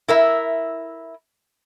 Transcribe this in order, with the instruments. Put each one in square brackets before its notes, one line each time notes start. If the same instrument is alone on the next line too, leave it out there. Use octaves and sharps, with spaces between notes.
[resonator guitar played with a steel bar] E4 A#4 E5